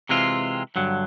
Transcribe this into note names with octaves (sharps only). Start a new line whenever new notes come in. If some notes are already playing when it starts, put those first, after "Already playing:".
C3 E3 G#3 C4 F4
G2 D3 F#3